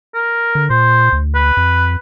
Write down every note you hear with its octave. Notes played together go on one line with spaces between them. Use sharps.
A#4
D3
A#2 C5
D2
B4
F2